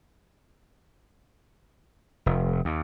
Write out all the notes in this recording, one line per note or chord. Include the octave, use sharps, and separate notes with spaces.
F1
D#2